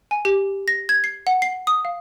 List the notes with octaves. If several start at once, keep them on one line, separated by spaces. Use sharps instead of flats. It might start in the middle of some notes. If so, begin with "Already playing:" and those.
G#5
G4
A#6
G#6
C7
F#5
C7
D#6
F5